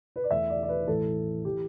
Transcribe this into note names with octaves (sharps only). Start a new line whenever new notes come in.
B4
D5
E2 E3 A3 E5
D5
D5
B4
A1 A2 E3 A4
E3 G4